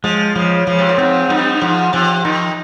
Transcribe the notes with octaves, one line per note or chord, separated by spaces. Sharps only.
F3 G#3
C#3 F3
C#3 F3
C3
A#2
G#2 C4
G2 D#4
G#2 F3
C3 F3
D#3 D#4